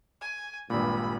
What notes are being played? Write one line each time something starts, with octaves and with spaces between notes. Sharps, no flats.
G#5
G#1 G2 A#2 B5